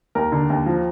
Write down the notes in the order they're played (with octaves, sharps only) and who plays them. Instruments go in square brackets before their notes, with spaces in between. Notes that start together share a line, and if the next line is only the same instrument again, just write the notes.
[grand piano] D#2 A#4
D3
D#2
F3